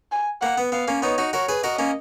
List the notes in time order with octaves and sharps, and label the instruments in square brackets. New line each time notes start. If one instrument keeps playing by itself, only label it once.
[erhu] G#5
[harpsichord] A#3 [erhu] F#5
[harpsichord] B3
[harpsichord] B3 [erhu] F5
[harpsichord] A#3 C#4
[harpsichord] B3 D#4 [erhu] C#5
[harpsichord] D#4 F#4
[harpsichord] F#4 A#4 [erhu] C#5
[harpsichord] G#4 B4
[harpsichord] F#4 A#4 [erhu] D#5
[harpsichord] A#3 C#4